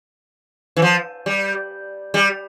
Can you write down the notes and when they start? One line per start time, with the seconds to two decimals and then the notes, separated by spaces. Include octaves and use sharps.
0.77 E3
0.82 F3
1.26 G3
2.14 G3